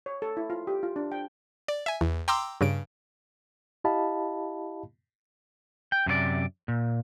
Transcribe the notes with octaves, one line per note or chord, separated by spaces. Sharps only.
C#5
A4
E4
F4
G4
F4
D4
G5
D5
E5 G#5
E2
G5 A#5 C6 D6 E6
G2 C#3 D7
E4 G4 D#5 F5 A5 B5
G5
F#2 C3 F4 D5
A#2